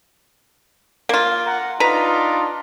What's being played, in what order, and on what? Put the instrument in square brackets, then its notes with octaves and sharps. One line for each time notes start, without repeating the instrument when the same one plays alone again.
[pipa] A#3 F4
[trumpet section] F#5 A#5
[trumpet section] D4 D#4 F4 [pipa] B4 A#5